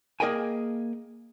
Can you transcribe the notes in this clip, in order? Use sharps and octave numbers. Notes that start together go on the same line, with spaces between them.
A#3 G#4 A#4 D#5 G5 G#5